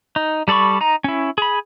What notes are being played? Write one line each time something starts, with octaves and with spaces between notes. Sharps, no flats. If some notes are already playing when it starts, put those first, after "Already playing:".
D#4
G3 A4 D5 B5 C#6
D#4 A#5
C#4 E4
G#4 B5